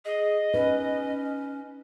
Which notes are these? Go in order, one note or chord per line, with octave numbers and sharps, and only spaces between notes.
G#4 D#5
C#4 D#4 B4